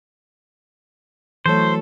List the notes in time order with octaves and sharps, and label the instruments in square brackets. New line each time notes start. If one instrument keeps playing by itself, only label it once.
[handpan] E3 F#3 C#5 [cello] A3 A4 [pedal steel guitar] C5